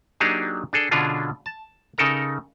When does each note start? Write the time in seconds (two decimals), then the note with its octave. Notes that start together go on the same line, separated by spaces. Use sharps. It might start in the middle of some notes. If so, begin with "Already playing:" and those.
0.20 F#3 A#3 D4 D#4 G4 G#4
0.73 D4 G#4 A4
0.91 B2 D3 C#4 D4 F4 G#4
1.46 A5
1.98 C#3 D#4 A4 A#4 A#5